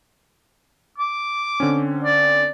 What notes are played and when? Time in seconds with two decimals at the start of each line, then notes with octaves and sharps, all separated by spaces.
0.98 D6
1.60 D3 C4 C#4
2.04 D5